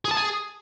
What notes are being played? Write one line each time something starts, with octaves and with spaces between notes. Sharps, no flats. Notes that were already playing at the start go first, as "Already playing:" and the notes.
G#4
A5
G#4